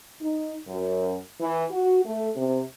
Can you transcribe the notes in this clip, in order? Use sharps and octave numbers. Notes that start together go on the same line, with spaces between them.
D#4
F#2
E3
F#4
A3
C3